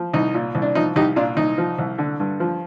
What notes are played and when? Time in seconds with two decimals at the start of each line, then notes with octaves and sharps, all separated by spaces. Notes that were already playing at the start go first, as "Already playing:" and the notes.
Already playing: F3
0.14 C2 D#4
0.34 A#2
0.55 C2
0.62 D4
0.75 F3 D#4
0.96 C2 D#4 G4
1.16 A#2 D4 F4
1.37 C2 D#4
1.58 F3
1.78 C2
1.98 D3
2.20 G2
2.40 F3